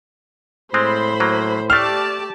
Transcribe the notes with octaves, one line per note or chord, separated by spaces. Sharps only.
A2 G#3 C4 C5 B5
F#3 A#3
A3 G4 C5 D5 A5 F6